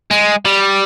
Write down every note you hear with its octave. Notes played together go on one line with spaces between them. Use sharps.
G#3
G3